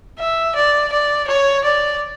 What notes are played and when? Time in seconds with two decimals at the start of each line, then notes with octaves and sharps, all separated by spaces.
0.19 E5
0.55 D5
0.92 D5
1.27 C#5
1.64 D5